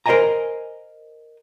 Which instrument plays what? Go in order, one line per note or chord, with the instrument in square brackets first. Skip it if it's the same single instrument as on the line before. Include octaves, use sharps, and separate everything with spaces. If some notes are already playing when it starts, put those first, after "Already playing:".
[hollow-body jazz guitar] A#4 C5 D5 D#5 G#5 A#5